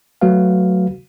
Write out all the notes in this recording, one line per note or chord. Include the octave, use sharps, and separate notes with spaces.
F#3 A3 F#4 B4 F5